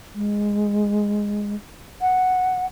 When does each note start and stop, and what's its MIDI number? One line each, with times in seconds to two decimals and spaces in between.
0.14 1.55 56
2.01 2.66 78